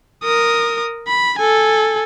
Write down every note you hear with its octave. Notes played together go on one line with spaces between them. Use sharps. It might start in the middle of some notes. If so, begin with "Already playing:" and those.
A#4 D#6
B5
A4 G#5